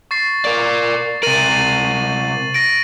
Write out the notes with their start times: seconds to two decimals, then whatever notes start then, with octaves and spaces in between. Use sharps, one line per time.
0.11 C#6 A6 C7
0.45 A#4 D5
1.23 C3 A#4 A6 D#7 F#7
2.54 A#6 D7